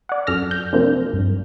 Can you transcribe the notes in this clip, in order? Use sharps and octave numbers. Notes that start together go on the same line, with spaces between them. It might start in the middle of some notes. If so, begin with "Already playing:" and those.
D5 F#5
F#2 A4 F6 A#6
G6
C3 F3 A#3 C4 D4
G2